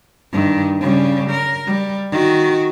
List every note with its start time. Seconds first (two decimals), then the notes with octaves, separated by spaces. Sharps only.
0.33 G2 D#3
0.81 C#3 G3
1.31 A#4
1.67 G3
2.12 D#3 F#4